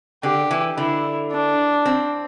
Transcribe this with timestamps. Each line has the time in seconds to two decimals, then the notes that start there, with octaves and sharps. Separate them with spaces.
0.23 D3 G4
0.51 E3
0.77 D3 E4
1.32 D4
1.86 C4